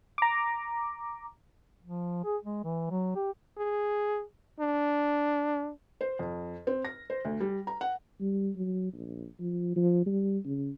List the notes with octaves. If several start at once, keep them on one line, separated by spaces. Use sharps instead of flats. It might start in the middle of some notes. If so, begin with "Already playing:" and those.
A#5 D6
F3
G#4
G#3
E3
F#3
G4
G#4
D4
C5
F2
C4
A#6
C5
D2
G3
A#5
F#5
G3
F#3
A#1
F3
F3
G3
C#3